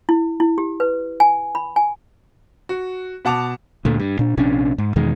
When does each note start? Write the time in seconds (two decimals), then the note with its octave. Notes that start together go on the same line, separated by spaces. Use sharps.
0.09 E4
0.40 E4
0.58 G4
0.80 B4
1.20 G#5
1.55 B5
1.76 G#5
2.69 F#4
3.25 B2 F#5 A5 D6 F7
3.85 D2 A#2 A3
3.99 G2
4.19 A#2 D4
4.37 A#1 C3 C#4 D4
4.78 G#2
4.96 E2 B2 D#3 G#3